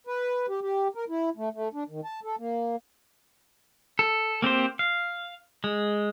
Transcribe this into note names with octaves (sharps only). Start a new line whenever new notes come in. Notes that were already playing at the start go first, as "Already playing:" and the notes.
B4
G4
G4
A#4
E4
A3
A3
D4
D#3
A5
A4
A#3
A4
A#3 C4 G4 C5
F5
G#3